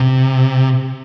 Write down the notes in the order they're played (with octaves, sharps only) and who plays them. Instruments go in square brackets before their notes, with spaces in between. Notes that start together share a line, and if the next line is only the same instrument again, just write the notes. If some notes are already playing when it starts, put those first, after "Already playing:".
Already playing: [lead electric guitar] C3